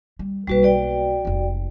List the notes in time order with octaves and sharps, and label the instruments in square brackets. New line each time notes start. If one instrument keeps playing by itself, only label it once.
[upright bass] G3
[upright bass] B1 A#3 [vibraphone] G3 F#4 B4
[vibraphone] F#4 D5 G5
[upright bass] F1 G#3